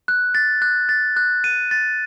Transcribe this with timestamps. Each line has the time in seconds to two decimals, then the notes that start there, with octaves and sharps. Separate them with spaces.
0.08 F#6
0.35 A6
0.62 F#6
0.89 A6
1.16 F#6
1.44 D#7
1.71 A6